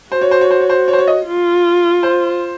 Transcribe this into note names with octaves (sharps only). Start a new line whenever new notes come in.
F#4 C5
C#5
C5
C#5
C5
C#5
C5
C#5
C5
C#5
D#5
F4
C5